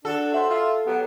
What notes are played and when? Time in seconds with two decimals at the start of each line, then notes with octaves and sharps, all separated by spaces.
0.05 D4 F#4 A4
0.33 F#4 C5 E5
0.49 F4 E5
0.86 F#3 B3 G4